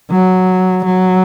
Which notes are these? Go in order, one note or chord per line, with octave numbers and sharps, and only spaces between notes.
F#3
F#3